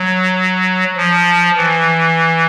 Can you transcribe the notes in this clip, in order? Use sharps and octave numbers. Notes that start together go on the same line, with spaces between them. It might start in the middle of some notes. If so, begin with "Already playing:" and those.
Already playing: F#3
F3
E3